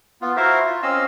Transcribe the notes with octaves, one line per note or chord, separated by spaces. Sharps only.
B3 F4
E4 F#4 A#4 C5 E5 F5
F4
C4 C#4 D#5 F5 E6